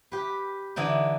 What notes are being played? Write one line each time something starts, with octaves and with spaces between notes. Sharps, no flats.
G4 B4
D3 E3 D4 D#4